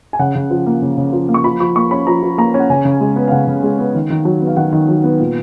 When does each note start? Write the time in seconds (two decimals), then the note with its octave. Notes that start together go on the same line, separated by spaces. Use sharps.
0.13 G#5
0.19 C#3 F#5
0.35 C#3
0.51 F3
0.66 A#3
0.82 C#3
0.98 C#3
1.13 F3
1.29 A#3
1.34 C#6
1.44 F3 B5
1.60 F3 C#6
1.76 A#3 C#6
1.91 C#4 B5
2.07 F3 A#5
2.23 F3
2.38 A#3 A#5
2.54 C#4
2.60 F#5
2.70 C#3 G#5
2.85 C#3
3.01 G#3
3.16 B3
3.28 F5
3.32 C#3 F#5
3.47 C#3
3.63 G#3
3.79 B3
3.95 D#3
4.10 D#3
4.25 F#3
4.41 B3
4.47 F5
4.57 D#3 F#5
4.72 D#3
4.88 F#3
5.04 B3
5.20 A#2